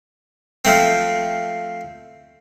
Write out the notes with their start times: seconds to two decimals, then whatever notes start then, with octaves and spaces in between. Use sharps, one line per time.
0.65 F3 A3 C4